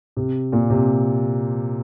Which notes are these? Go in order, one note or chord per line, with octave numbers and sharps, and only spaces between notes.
C3
A#2
C3